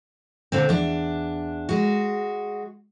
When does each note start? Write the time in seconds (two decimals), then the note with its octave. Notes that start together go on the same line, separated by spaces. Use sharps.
0.52 A#2 D3 C4
0.69 E2 D4
1.69 G#3 F#4